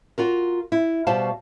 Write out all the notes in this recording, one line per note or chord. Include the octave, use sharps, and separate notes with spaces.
F4 F#4 A#4
E4
B2 G3 F#4 C5 F5 A5